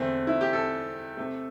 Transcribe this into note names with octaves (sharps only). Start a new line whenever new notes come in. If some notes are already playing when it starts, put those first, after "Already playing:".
Already playing: E2 D3 A3 C4
E4
G4
A4
C3 A3